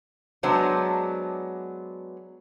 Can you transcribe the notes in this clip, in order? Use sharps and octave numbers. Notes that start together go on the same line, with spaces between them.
F#3 G#3 B3 D4 C5 C#5